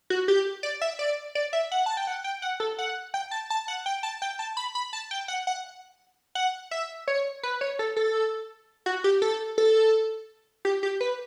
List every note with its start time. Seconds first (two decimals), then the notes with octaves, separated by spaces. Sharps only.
0.10 F#4
0.28 G4
0.63 D5
0.81 E5
0.99 D5
1.35 D5
1.53 E5
1.72 F#5
1.86 A5
1.97 G5
2.07 F#5
2.24 G5
2.42 F#5
2.60 A4
2.78 F#5
3.14 G5
3.31 A5
3.50 A5
3.68 F#5
3.86 G5
4.03 A5
4.22 G5
4.39 A5
4.57 B5
4.75 B5
4.93 A5
5.11 G5
5.28 F#5
5.47 F#5
6.35 F#5
6.71 E5
7.08 C#5
7.43 B4
7.61 C#5
7.79 A4
7.96 A4
8.86 F#4
9.04 G4
9.22 A4
9.58 A4
10.65 G4
10.83 G4
11.01 B4